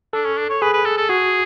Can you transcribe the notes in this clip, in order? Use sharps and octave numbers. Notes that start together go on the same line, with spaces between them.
D4 A4
C#4
D4
C#5
G#4 B4
B4
A4
A4
F#4 G#4